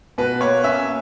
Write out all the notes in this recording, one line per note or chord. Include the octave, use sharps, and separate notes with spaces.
B2 B4
A#3 C#5
C#4 E5